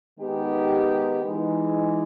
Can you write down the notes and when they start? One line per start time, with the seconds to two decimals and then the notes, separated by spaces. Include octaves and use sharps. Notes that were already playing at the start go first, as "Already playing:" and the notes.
0.19 D#3 G#3 B3 D#4 G4
1.24 E3 G#3 D#4